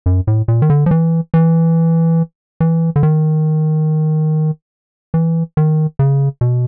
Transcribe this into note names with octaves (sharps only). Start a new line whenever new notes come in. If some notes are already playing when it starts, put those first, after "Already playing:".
F#2
A2
A#2
D#3
D3
F3
E3
E3
E3
D3
D#3
E3
D#3
C#3
B2